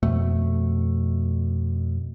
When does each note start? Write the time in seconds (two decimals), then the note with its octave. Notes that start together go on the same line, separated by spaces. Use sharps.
0.03 F2 B2 A3